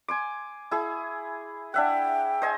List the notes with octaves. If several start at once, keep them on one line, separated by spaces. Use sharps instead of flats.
G#5 C6 D6
E4 G#4
D4 E5 F#5 G5
C5 D#5 G#5